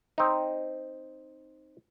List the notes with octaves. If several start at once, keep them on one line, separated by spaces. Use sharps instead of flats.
C4 D#4